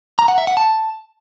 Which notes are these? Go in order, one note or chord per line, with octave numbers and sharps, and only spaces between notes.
A#5
F#5
E5
F#5
A5